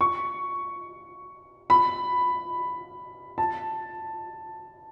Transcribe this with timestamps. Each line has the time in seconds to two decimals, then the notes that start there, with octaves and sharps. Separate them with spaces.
0.01 C#6
1.70 B5
3.38 A5